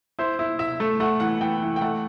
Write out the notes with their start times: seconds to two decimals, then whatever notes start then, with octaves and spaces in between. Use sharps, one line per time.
0.19 E4 C5
0.39 E4
0.59 E4 E5
0.80 A3
1.00 A3 F#5
1.20 E3 F#5
1.41 E3 G5
1.62 E3
1.76 G5
1.81 A3 F#5